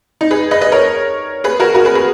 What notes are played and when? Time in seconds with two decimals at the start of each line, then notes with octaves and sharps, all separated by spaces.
0.21 D#4
0.31 G#4 B4
0.51 B4 D#5
0.61 B4 D#5
0.72 A#4 C#5
1.44 G#4 B4
1.60 F#4 A#4
1.75 F#4 A#4
1.85 G#4 B4
1.95 G#4 B4